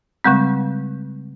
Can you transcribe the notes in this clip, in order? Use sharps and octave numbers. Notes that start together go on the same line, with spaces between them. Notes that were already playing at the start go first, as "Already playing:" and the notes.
C#3 G3 G#3 C4